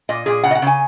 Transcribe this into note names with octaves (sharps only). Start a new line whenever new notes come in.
A#2 D#5
A#2 G#4
C#3 F#5
D#5
F#5
C#3 G#5